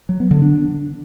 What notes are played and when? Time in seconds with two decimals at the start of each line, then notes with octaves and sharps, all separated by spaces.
0.09 F#3
0.20 B3
0.31 D3
0.42 D4